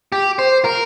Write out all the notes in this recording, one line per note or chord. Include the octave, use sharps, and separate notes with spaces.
G4
C5
A#4